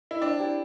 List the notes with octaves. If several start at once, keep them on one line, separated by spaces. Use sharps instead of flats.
E4
C4 D4
E4 G4 D5